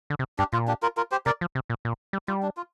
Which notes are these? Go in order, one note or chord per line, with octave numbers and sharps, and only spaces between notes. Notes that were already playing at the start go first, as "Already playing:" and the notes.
D3
C3
G2 D4 G4
A#2 F4
D4 G4
F4 A#4
F4 A#4
G4 C5
C3 A#4 D5
F3
C3
A#2
A#2
G3
G3 F4
D4
F4